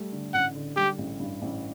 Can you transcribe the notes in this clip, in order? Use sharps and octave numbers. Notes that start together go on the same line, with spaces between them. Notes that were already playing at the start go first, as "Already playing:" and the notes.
Already playing: G3 A3
D3
A1 F#5
D3
G3 G4
A1
G2
A1